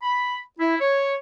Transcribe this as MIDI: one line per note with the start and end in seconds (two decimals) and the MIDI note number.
0.02 0.39 83
0.59 0.76 64
0.80 1.14 73